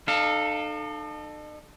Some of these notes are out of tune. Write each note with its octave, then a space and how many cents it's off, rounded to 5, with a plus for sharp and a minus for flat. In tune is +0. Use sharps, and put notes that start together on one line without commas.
D#4 -45 A4 +0 F5 +0